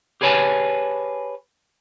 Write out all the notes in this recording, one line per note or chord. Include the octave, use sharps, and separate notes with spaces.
G4 G#4 B4 C#5 G#5 A5